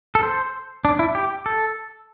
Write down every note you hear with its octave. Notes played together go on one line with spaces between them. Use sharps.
A4
C5
D4
E4
G4
A4